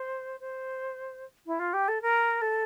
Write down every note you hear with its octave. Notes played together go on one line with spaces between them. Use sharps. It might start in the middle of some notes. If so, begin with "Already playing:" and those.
Already playing: C5
C5
E4
F4
G4
A4
A#4
A4